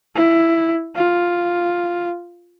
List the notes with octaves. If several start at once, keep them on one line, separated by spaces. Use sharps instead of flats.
E4
F4